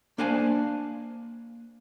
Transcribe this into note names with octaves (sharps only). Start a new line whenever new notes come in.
A#3 D4 C5 D5 F5 G#5